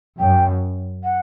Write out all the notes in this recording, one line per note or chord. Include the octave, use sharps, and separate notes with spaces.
F#2 G5
F#5